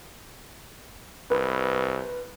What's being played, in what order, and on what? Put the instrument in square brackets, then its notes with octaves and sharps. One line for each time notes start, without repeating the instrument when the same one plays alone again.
[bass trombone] C2 [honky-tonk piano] B4